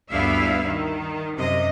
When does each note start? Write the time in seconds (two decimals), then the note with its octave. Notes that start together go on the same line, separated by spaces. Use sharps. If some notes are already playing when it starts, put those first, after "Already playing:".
0.10 D2 G2 B3 E4 E5 F5
0.66 D#3
1.35 F#2 C3 D#5